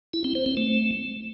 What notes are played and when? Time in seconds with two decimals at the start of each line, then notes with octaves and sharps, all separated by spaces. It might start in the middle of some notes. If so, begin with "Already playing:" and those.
0.13 E4
0.24 C4
0.35 C5
0.46 C4
0.57 A3